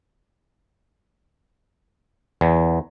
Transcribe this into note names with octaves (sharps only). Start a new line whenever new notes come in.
E2